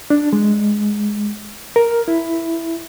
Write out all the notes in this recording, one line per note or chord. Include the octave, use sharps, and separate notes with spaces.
D4
G#3
A#4
E4